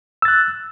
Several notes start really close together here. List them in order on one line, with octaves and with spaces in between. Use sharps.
E6 A6 F#6